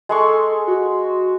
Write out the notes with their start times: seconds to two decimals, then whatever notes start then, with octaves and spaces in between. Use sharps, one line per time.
0.09 G#3 A4 C6 C#6
0.67 F#4